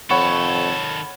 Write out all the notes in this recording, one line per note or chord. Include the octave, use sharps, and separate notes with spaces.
F2 D#3 A4 C#5 F#5 B5 C#6